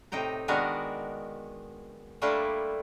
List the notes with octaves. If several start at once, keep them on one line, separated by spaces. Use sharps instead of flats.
A2 C3 D#4 G5 A#5
D#3 G#3 B3 D4 F#4 A#4
G3 A3 A#3 D4 E4 F4